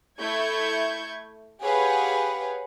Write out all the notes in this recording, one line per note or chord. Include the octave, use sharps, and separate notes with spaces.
A3 E4 C#6 G6 G#6
G4 G#4 B4 C#5 F5 F#5